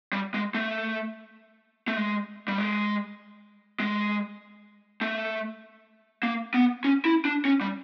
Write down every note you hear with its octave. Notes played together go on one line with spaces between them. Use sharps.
G3
G#3
A3
A3
G#3
G3
G#3
G#3
A3
A#3
B3
C#4
E4
D4
C#4
G3